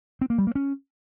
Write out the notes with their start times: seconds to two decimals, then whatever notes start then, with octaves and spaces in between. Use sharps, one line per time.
0.21 C4
0.30 A#3
0.38 G3
0.47 A#3
0.55 C#4